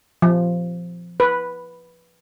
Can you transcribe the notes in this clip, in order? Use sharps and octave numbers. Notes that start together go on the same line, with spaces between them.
F3
B4